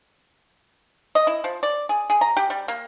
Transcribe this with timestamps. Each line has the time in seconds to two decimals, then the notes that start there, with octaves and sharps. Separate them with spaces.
1.15 D#5
1.27 E4
1.44 F3
1.63 D5
1.89 G#4
2.10 G#4
2.21 A#5
2.37 G4
2.50 G3
2.68 A#3